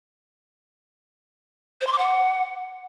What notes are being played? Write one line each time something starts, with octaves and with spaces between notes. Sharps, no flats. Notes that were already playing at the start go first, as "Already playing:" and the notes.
C5
C6
D6
F#5